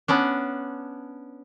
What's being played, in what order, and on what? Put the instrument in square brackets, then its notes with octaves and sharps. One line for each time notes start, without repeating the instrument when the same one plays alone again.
[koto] B3 C#4 D4